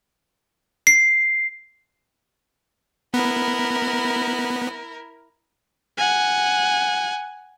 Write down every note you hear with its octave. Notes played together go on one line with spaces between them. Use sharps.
C7
B3 E4 A#4
F#5 G#5